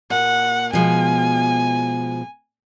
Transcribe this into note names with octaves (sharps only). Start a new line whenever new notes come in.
A#2 F#5
B2 F3 G#3 G#5